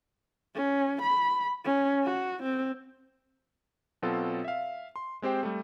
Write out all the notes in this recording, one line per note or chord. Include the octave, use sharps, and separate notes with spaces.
C#4
B5
C#4
F#4
C4
B2 F#3 C4 F4 A4
E5 F5
C6
G#3 C4 G4 C5 G5
G3 A3